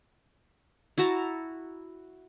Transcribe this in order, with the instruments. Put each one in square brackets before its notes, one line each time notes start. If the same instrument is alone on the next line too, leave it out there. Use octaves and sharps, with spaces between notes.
[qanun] E4 F#4 A5 A#5